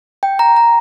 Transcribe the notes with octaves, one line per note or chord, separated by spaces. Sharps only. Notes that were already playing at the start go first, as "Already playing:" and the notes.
G5
A#5
A#5